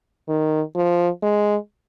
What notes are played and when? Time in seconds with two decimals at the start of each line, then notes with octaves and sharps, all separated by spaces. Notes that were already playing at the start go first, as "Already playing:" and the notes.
0.29 D#3
0.76 F3
1.23 G#3